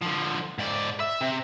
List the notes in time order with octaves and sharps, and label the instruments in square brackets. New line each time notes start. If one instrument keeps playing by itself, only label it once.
[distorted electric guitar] D3 F3
G#2 D5
E5
C3